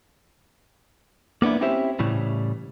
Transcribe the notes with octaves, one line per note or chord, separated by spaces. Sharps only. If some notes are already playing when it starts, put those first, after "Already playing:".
A#3 B3 D4 E4
C4 C#4 E4 G4 C5 E5
A2 C#3 E3 G3